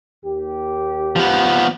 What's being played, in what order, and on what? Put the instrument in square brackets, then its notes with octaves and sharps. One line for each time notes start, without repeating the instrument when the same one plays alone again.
[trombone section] D#2 G4
[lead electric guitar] F3 B3